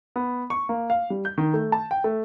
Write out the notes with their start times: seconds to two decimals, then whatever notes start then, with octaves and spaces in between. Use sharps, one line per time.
0.16 B3
0.50 C#6
0.69 A#3
0.90 F5
1.10 G3
1.25 G6
1.38 D#3
1.54 A3
1.72 A5
1.91 G5
2.04 A3